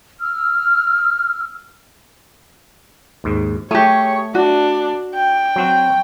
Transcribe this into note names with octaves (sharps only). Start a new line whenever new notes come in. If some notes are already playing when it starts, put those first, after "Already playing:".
E6 F6
D#2 G#2
A3 G4 G#4 C#5
D4 F#4
G5
F#3 C4 F#4